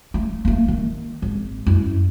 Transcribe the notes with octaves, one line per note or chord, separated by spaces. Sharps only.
A3
A3 A#3
D#3
G#1
F#2 E4